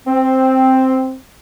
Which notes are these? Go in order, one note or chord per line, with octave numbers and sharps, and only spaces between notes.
C4